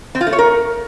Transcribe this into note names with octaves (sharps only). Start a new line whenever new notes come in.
C4
F4
A3
C#5
A#4